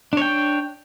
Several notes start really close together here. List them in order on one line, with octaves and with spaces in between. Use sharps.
D4 C#5 G5